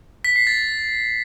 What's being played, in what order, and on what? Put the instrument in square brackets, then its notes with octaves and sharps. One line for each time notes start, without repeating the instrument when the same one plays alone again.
[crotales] B6
C7
A6